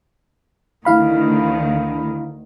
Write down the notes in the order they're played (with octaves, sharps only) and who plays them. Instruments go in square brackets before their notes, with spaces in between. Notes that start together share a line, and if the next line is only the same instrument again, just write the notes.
[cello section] D2 D3 D#3 [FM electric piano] E4 F5 B5